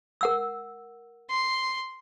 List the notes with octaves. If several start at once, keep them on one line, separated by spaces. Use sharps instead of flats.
A#4 F#5 E6
C6